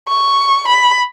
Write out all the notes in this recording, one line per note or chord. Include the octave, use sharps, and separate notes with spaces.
C#6
B5